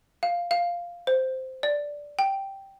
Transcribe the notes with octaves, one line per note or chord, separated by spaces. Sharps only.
F5
F5
C5
D5
G5